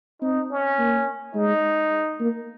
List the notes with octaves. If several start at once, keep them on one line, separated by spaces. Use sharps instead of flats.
C4 D#4
C#4
A#3
G#3 D#4
A#3